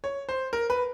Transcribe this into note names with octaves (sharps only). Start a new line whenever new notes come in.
C#5
C5
A#4
B4